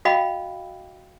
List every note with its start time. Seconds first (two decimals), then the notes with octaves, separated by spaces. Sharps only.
0.05 F#4 D#5 F5 G5 B5